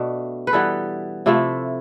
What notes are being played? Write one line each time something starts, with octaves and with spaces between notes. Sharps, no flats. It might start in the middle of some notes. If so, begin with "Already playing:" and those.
Already playing: B2 A3 D4
B4
E3 G3 B3 A4
C3 F3 A3 E4